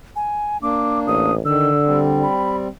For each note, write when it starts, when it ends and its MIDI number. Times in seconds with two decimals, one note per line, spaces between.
0.16 0.58 80
0.62 1.31 58
0.62 1.31 62
0.62 1.00 86
1.07 1.40 33
1.07 1.34 87
1.45 2.26 50
1.45 1.70 51
1.45 1.98 88
1.86 2.68 55
1.86 2.68 60
2.22 2.56 83